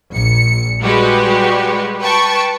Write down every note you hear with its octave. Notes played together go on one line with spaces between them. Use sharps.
A#1 C#7
G3 G#3 F#4 G4 B4
B4 G5 A5 C#6